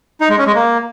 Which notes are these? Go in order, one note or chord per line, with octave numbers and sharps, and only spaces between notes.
D#4
G#3
C#4
G#3
A#3